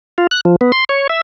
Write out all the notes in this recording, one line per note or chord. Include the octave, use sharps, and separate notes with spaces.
F4
F#6
F3
B3
C6
C#5
E5